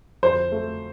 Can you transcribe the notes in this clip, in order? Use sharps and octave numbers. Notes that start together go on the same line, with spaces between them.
F2 C5
A3